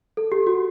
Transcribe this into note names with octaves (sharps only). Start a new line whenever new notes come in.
A4
G4
F#4